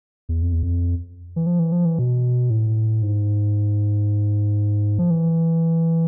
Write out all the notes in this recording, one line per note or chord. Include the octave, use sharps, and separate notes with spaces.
E2
F2
E2
F2
E3
F3
E3
F3
E3
B2
A2
G#2
F3
E3